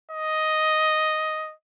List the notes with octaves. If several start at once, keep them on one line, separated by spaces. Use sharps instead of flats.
D#5